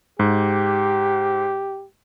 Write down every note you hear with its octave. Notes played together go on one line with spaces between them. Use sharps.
G#2 G4